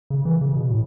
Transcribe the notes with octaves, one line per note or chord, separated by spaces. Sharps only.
C#3
E3
C#3
B2
A2